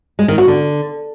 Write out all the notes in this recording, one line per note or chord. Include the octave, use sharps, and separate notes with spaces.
G#3
D#3
F#4
D3